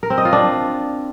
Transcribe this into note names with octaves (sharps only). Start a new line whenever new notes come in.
A#4
C4
D#5
F4
D4